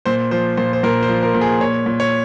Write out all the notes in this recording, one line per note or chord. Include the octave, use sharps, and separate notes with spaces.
A#2 C5
F3 C5
A#2 C5
C5
A#2 A#4
C5
F3
A#4
A#2
G#4
A#2 C#5
A#2
C#5